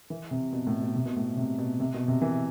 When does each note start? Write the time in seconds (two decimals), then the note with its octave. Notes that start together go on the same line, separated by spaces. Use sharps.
0.10 E3
0.31 C3
0.53 B2
0.67 A2
0.81 B2
0.96 C3
1.06 B2
1.16 A2
1.37 C3
1.58 B2
1.80 C3
1.94 B2
2.08 C3
2.22 E3